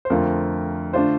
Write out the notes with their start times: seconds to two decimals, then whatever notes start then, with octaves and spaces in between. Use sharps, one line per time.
0.05 C5
0.10 F2 D3 A3 C4 F4 A#4
0.93 D3 A3 D4 F4 C5